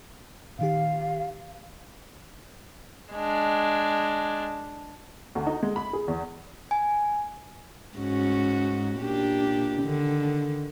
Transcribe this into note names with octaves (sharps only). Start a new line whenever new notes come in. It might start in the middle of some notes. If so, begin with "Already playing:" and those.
A#2 D#3 G4 F5
G#3 D4
D2
D#4
G#3
B5
G#4
E2
G#5
G#2 C#4 F#4
A#2 D4 G4
D3 D#3